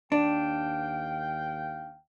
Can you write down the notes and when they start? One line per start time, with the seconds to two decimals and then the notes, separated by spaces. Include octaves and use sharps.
0.12 D#2 D4 F5 G5